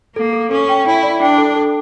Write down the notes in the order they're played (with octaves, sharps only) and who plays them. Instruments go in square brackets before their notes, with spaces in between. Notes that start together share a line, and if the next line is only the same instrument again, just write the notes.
[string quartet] A#3 [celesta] A4
[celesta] A4
[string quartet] C#4 [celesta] A4
[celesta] G5
[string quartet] E4 [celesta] G5
[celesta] D5
[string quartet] D4 [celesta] G5
[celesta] A4
A4